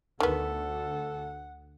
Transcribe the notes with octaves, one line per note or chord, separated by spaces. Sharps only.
D2 D#3 B3 A4 F#5